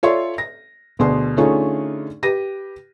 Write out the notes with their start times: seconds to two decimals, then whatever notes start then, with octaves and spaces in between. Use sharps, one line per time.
0.03 F4 A4 C#5 D5 E5 C6
0.38 A#6
0.99 D2 B2 D4 G#4 C6
1.37 D3 A3 C#4 D#4 F4 G#4
2.23 G4 B4 A#6 D#7